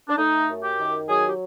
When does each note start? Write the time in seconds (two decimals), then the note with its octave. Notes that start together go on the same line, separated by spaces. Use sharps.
0.08 D4
0.17 A3 D#4
0.48 F#2
0.63 G4
0.78 D#3
1.08 F#3 G#4
1.28 G4